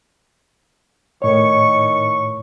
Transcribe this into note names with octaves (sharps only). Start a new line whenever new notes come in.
A2 D#3 C#5 C#6